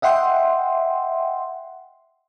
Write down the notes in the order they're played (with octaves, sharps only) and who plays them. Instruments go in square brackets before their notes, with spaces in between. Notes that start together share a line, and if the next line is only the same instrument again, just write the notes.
[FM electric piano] D#5 E5 F#5 G5 C6